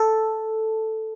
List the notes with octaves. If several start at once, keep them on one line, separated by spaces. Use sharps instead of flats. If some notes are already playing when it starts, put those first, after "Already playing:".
Already playing: A4